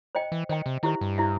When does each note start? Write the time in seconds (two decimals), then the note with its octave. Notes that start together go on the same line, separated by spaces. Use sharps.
0.15 C5 D#5 G5
0.32 E3
0.49 D#3 C5 D#5 G5
0.66 C3
0.83 D#3 E4 G4 C5 E5
1.01 G2
1.18 E4 G4 C5 E5